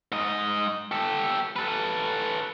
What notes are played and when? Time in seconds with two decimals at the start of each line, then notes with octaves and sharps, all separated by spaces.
0.12 G#2 D#5
0.91 G4 A4
1.56 A4 B4